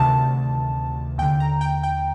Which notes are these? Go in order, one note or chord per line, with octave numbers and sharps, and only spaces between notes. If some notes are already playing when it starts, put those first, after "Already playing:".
Already playing: D2 C3 D#3 A5
D#2 D3 G5
A#5
G5
G5